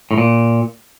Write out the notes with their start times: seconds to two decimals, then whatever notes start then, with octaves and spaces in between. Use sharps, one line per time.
0.11 A2
0.18 A#2